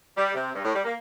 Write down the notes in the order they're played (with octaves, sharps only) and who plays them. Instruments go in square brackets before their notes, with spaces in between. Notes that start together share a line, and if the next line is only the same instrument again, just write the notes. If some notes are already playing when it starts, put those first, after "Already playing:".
[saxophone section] G3
C3
G2
A2
G3
A#3